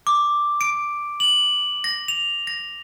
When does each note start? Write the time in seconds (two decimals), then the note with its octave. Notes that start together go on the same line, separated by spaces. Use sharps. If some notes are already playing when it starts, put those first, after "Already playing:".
0.07 D6
0.61 D7
1.20 F#7
1.84 A#6
2.08 F7
2.47 A#6